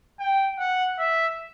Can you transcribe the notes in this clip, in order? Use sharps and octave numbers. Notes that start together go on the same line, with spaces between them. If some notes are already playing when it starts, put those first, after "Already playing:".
G5
F#5
E5